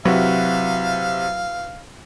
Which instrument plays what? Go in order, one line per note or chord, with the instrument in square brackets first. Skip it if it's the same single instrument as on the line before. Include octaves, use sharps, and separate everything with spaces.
[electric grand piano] C3 [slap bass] F#3 [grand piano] E4 F#4 B4 [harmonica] F5